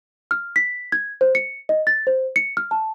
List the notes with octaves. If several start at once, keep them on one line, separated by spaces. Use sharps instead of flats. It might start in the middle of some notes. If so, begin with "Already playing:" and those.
F6
B6
G#6
C5
C#7
D#5
A6
C5
C#7
F6
A5